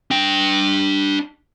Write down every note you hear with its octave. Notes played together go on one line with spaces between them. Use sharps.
D4 G5